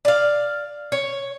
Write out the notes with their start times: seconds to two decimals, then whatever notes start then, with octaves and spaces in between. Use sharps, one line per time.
0.05 D5 F5
0.92 C#5